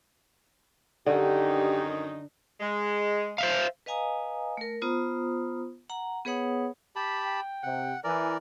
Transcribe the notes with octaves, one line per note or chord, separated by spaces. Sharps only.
F#2 D3 D#3 D4 D#4 G4
G#3
C5 E5 F5
B4 D#5 F5 G#5 A#5 D#6
A3 A#4
B3 F4 C5 A#5 D#6
F#5 A#5
B3 G#4 B4 C#5 F#5 D#6
G4 A5 B5
G5
C3 F#5
E3 A#4 D5 G#5